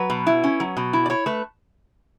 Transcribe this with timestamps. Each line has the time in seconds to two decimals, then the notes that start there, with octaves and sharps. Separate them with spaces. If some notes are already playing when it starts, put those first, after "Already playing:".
Already playing: F#3 B4
0.10 B2
0.27 E4
0.44 C#4
0.60 F#3
0.77 B2
0.93 E4
1.06 D5
1.10 E4 C#5
1.26 A3 B4